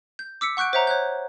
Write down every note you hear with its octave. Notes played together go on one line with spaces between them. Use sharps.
G6
D6 E6 B6 C#7
F#5 C#6 F#6 G6 D7
C5 C#5 E5 F#5 A#5
C#5 F#6 G6